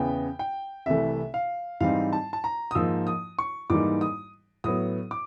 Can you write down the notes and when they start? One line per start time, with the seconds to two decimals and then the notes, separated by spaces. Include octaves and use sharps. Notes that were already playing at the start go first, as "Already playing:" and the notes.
Already playing: E2 C#3 B3 G5
0.39 G5
0.86 C2 C3 E3 A3 E5
1.34 F5
1.80 G#2 E3 G3 C4 D#4 F5
2.13 A5
2.33 A5
2.44 A#5
2.71 D#6
2.75 G#2 F3 A#3 D#4 E6
3.07 D#6
3.39 C#6
3.70 G#2 E3 G3 A#3 D#4 D6
4.01 D#6
4.64 A2 F#3 B3 D#6
5.11 D6